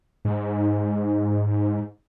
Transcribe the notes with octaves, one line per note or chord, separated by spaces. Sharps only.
G#2